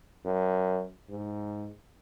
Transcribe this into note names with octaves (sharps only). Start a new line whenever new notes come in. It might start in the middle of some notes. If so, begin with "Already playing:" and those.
F#2
G#2